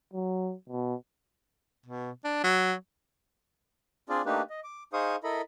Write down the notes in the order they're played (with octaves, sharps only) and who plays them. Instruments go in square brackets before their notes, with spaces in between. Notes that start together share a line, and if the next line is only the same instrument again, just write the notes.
[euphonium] F#3
B2
[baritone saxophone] B2
D4
F#3
[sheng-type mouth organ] C4 D4 F4 G#4 D5
A3 A#3 D4 D#4 G4 B4
D#5
D6
D#4 G#4 C5 F5 C#6 D#6
E4 A4 A#4 D#5 B5